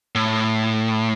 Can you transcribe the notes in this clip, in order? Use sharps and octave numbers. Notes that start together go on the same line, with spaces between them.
A2